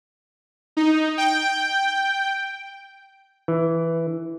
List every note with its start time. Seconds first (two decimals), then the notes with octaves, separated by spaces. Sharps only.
0.77 D#4
1.18 G5
3.48 E3